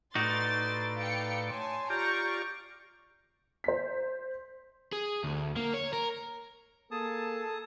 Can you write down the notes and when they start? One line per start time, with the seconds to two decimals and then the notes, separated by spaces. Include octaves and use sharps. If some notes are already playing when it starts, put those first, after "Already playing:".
0.15 A2 D#4 F#4 B4 D5 C6 A6
0.98 F5 G5 C#7
1.50 C#5 G#5 A5 C6
1.90 F4 G4 D5 A#5 C#6 G6
3.64 C5 B6
4.92 G#4
5.24 D2
5.56 A#3
5.74 C#5
5.93 A#4
6.91 A#3 G#4 A4 A5 D#6